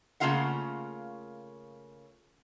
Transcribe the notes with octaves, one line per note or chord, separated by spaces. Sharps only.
C#3 A3 A#3 F4 F5 F#5